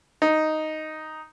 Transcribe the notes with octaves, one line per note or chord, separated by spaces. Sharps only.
D#4